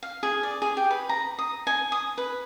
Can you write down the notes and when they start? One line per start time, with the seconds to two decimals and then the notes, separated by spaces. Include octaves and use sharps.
0.03 F5
0.23 G#4
0.43 D5
0.62 G#4
0.77 G4
0.91 B4
1.09 A#5
1.39 D#6
1.67 G#5
1.92 D#6
2.18 B4